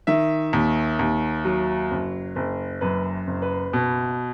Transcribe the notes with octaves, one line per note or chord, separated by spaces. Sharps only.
D#3 E5
D#2
D#2
F#3
F#1
F#1
F#2 B4
F#1
B4
B2